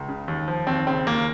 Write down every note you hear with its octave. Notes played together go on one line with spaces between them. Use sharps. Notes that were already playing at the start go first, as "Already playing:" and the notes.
Already playing: C#2
C#3
D#2
F3
D#2 C4
C#3 C4
D#2 A#3